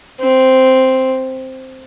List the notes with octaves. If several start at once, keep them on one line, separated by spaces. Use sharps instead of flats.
C4